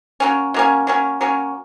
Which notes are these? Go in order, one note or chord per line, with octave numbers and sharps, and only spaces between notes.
F#3 A#3 C#4
F#3 A#3 C#4
F#3 A#3 C#4
F#3 A#3 C#4